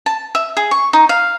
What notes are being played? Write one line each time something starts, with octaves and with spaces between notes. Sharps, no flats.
A5
E5
G#4
C#6
D#4
F5